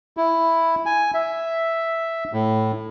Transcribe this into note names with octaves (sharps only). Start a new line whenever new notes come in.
E4
G#5
E5
A2